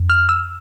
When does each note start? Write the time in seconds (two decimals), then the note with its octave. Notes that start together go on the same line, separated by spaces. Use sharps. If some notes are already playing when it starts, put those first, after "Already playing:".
Already playing: F2
0.10 F6
0.29 E6